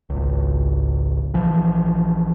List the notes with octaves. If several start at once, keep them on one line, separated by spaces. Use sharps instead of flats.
G#1 C#2
A#1 E3 F3